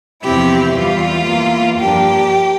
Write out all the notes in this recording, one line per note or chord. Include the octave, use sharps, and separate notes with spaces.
E2 C3 F3 C4 E4 G4
E2 E3 G3 F4
E2 E3 A#3
G2 F3 A#3 D4 G4